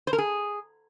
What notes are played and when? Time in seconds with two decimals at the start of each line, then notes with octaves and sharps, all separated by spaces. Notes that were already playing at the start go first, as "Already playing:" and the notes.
0.07 C5
0.13 A#4
0.18 G#4